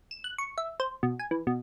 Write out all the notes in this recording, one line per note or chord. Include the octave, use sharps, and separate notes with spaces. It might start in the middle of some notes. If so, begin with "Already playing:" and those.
E7
F#6
C#6
E5
C5
B2
G#5
E3
B2